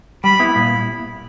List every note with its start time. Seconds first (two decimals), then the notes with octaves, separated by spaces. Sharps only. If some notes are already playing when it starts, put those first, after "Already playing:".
0.24 G3 B5
0.40 B3 E4
0.56 A#2